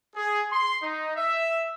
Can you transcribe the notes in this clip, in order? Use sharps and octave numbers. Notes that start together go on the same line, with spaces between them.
G#4
C6
D#4
E5